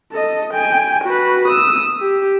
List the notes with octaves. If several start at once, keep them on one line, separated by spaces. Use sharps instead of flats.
A4 D#5
G5 G#5
F#4 B4
D#6 E6
G4